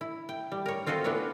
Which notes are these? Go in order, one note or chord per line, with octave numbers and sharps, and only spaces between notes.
E4
G5
G3
A#4 C#5
C4 F4 F#4 A4 D#5
B3 C#4 D4 E4 B4 C#5